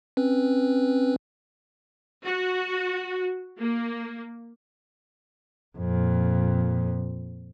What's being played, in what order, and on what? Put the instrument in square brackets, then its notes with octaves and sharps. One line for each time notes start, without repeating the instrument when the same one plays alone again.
[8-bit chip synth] C4 C#4 B4
[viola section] F#4
A#3
[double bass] F2 A#2